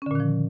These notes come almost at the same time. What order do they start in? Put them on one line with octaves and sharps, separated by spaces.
C#4 D3 A#2 D#3 F3